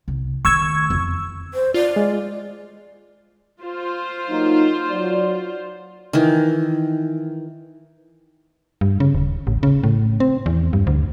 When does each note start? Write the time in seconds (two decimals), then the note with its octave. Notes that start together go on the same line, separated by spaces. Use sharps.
0.08 C2
0.45 D#3 A3 C#6 E6 G#6
0.90 F2 E3
1.54 C5
1.74 F4 D5
1.96 G#3
3.60 F4 C5
4.29 F#3 A#3 D#4
4.90 F#3 D5
6.13 D#3 E3
8.81 G2
9.00 C#3
9.15 D#1
9.47 A1
9.63 C#3
9.83 A2
10.20 C4
10.46 E2
10.73 G2
10.87 D2